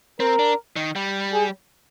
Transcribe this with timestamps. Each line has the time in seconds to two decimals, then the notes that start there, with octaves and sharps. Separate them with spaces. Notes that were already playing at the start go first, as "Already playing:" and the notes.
0.20 C4 A#4
0.39 D4
0.76 D#3
0.96 G3
1.33 G#4